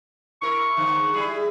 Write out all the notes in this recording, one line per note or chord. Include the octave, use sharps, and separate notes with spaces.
E4 A#4 C#6
D#2 G#2 D3
G3 E4 G#4